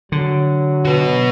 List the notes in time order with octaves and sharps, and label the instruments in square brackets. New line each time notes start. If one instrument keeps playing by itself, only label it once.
[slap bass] D3 [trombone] F#3
[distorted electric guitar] F#4 B4